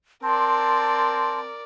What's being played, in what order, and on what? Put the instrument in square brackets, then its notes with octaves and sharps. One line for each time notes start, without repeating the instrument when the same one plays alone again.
[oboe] C4 [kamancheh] A#4 D5 [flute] A5 [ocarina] C6